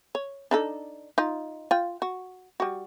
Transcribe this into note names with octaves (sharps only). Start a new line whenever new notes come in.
C#5
D4 D#4 A4
D#4 F4
F4 G5
F#4
G3 F#4